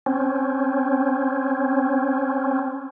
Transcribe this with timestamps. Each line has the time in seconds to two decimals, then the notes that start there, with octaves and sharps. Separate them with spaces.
0.06 C4 C#4